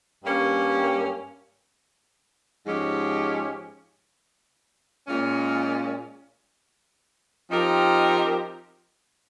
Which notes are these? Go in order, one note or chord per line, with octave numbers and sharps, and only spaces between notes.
G2 G3 A#3 C#4
G#2 F3 G#3 C#4 G4
A#2 G#3 C#4
F3 C4 D#4 G4 A#4